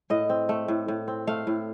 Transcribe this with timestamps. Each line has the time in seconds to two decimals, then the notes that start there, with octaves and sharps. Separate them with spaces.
0.10 A2 D#5
0.29 C4
0.49 A3
0.68 A2
0.88 A2
1.08 C4
1.27 A3 F5
1.47 A2